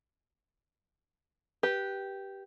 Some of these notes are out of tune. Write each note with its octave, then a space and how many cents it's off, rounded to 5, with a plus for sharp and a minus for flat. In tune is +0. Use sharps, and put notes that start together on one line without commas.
G4 -5 B4 -20